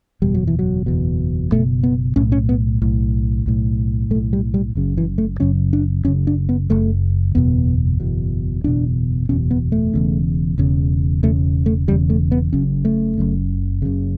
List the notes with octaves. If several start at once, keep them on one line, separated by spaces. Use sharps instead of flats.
F#1 E2 B2 G3
F#3
E3
F#3
F#1 E2 B2
F#1 E2 B2 A3
B3
B1 A2 C#4
C#4
B3
B1 A2
B1 A2
B1 A2 A3
G3
G3
F#1 F#2 C#3
E3
A3
F#1 F#2 C#3 C#4
D4
F#1 F#2 C#3 C#4
D4
B3
F#1 F#2 C#3 A3
F#1 E2 B2 B3
F#1 E2 B2
F#1 E2 B2 D4
F#1 E2 B2 C#4
B3
A3
E1 E2 C#3
E1 E2 C#3
E1 E2 C#3 A3
A3
E1 E2 C#3 G3
A3
B3
F#1 F#2 C#3 C#4
A3
F#1 F#2 C#3
F#1 F#2 C#3